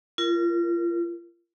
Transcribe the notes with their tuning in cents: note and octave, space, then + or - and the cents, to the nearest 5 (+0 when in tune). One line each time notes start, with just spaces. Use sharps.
F4 -35 A#4 +0